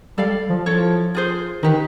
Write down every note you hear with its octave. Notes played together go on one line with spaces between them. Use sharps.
G3 A4 D5 F5
F3
F3 E4 A4 C#5
F4 G#4 C5
D#3 D#4 G4 B4